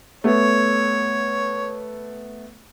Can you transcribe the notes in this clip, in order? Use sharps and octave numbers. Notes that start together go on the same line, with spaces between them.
A3 B3 C#5